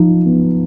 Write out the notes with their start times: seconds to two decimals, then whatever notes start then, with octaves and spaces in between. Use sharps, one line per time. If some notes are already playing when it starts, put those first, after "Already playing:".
Already playing: F3 D#4
0.26 B3